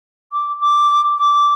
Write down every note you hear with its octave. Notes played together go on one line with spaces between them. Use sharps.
D6
D6
D6